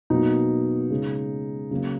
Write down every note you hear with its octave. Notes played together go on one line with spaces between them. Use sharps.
B2 F#3 A#3 D#4
C#3 G#3
C#3 F#3 A#3